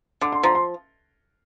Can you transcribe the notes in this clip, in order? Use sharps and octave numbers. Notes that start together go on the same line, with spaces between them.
D3 D6
C6
F3 A#5
C6